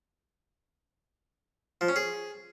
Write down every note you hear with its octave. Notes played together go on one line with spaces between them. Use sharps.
F3
C#4
G#4